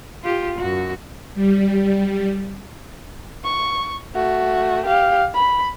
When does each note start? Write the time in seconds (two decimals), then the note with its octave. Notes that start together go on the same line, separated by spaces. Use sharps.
0.23 F4 G4
0.59 F#2 F#4
1.35 G3
3.44 C#6
4.15 A3 F#4
4.86 G4 F5
5.34 B5